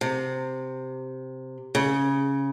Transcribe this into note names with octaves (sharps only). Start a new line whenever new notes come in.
C3
C#3